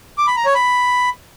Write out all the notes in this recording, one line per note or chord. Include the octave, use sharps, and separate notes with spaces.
D6
B5
A#5
C#5
B5